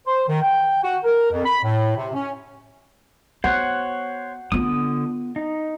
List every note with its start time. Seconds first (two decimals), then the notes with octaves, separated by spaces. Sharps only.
0.07 C5
0.29 D#3
0.43 G5
0.82 F#4
1.04 A#4
1.31 F2
1.46 B5
1.63 A2
1.97 C3
2.14 C#4
3.44 B3 C5 C#5 F#5
4.52 D3 B3 F4 D#6
5.36 D#4